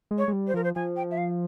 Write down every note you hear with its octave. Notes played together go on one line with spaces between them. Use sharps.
G#3
C#5
G#3
G3
C5
F3 A#4
C5
F3 G#5
G5
E5
F5